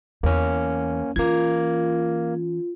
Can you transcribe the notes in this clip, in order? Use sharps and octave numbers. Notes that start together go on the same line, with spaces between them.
E2 A#3 C#4
E3 A#3 C#4 F4 G#6